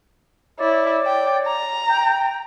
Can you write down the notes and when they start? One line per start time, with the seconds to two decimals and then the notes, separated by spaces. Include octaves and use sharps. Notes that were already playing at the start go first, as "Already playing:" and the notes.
0.59 E4 C#5 D5
1.06 G5
1.46 A#5
1.90 G5